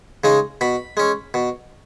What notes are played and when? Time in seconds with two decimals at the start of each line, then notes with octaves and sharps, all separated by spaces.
0.24 C#3 G#3 D#4
0.61 B2 B5
0.97 G#3 C#4
1.34 B2